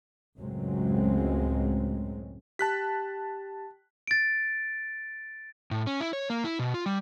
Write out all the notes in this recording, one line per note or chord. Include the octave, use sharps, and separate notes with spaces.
C#2 F#2 A2 F#3 G#3 C4
G4 A5 F#6 B6
A6 D7
A2
C#4
E4
C#5
A#3
E4
B2
F4
G3